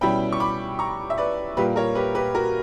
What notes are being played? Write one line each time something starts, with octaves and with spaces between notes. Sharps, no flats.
B2 G3 C#4 E4 G5 B5
C#6
B5 D6
A#5 C#6
E5
B4 D5
A#2 G3 A#3 G4 B4
A#4 C#5
G4 B4
G4 B4
F#4 A#4